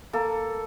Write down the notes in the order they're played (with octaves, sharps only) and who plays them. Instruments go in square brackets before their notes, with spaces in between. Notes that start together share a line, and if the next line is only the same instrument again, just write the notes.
[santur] A#3 A4